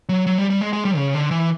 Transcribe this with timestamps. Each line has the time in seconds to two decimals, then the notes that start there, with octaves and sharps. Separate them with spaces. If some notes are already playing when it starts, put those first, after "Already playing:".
0.09 F#3
0.27 F#3
0.38 G3
0.50 G3
0.61 G#3
0.73 G#3
0.85 G3
0.96 C#3
1.14 D3
1.31 E3